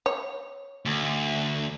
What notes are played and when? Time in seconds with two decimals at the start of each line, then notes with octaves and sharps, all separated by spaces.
0.06 C#5
0.85 D2